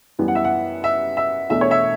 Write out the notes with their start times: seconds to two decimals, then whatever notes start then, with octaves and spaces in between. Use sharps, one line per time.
0.19 F#2 E3 G3 B3
0.28 F#5
0.35 E5
0.45 F#5
0.84 E5
1.17 E5
1.49 E1 E2 B2 A3 D4 E5
1.61 C#5
1.71 E5